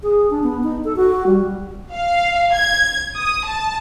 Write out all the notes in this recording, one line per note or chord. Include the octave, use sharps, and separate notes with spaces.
G#4
D4
B3
D#4
A4
F#4
G3
F5
G#6
D#6
A5